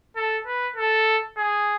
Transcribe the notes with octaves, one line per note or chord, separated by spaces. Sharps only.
A4
B4
A4
G#4